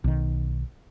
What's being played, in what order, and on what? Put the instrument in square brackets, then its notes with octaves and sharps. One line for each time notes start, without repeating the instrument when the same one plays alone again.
[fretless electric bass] B1 D#3